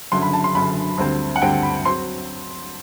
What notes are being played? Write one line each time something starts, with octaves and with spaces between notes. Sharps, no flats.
F#1 F#2 D3 C6
B5
A5
C6
F#1 F#2 D3 B5
D2 D3 G3 C4
F#5
D2 D3 G3 C4 G5
B5
F#3 C4 C6